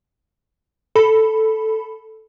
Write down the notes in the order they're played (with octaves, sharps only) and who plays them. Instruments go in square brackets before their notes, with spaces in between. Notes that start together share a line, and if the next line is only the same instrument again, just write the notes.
[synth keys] A4 B5